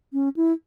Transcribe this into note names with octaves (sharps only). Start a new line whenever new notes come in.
C#4
E4